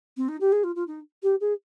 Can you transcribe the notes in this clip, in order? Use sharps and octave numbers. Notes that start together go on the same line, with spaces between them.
C4
D#4
G4
G#4
F4
F4
D#4
G4
G#4